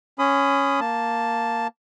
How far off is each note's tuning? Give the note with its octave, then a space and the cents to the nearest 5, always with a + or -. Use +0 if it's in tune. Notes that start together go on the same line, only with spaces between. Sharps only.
C#4 +0 B5 +35 D#6 +0
A#3 +0 A5 +0